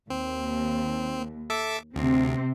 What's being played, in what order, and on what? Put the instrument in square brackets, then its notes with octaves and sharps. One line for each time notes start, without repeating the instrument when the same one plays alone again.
[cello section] D#2 [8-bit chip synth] C4
[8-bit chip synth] A4 E5 D6
[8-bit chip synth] D2 [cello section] C3 C4